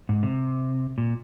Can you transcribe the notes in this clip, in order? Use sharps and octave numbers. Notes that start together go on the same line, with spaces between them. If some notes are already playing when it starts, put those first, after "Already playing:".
G#2
C3
A#2